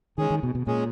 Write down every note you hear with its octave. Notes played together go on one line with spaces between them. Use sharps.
D#3 G#3 C#4 G#4
D#3
B2
B2
A#2 G#3 C#4 G#4